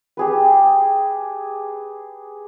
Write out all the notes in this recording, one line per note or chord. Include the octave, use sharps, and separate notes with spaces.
G4 G#4 B4